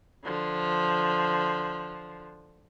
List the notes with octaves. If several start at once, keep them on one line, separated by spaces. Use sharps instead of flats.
D3 F3